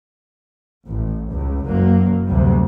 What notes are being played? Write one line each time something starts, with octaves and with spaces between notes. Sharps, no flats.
A1
C#2
F#1 F#3 A#3
D2 G2 C3 F#3 G3